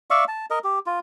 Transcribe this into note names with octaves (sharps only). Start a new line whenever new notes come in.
D5 E5 F5 C#6
A5
A#4 D#5
G4
F4